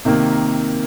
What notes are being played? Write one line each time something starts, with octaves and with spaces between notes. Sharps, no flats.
C3 D#3 A#3